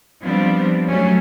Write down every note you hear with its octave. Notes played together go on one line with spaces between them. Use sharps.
F3 G3 B3 C4 D4
F#3 A3 C#4